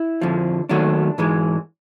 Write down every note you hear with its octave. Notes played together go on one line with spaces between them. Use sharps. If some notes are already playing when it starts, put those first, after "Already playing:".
Already playing: E4
F2 D3 F3
D#2 D#3 F#3 A3 D4
G#2 E3 G#3